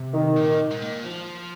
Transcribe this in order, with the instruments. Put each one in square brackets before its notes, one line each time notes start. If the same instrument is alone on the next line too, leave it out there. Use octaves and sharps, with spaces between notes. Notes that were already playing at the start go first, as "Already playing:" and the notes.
Already playing: [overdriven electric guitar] C3
[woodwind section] D#3
[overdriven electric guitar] A#2
G#2
A#2
F3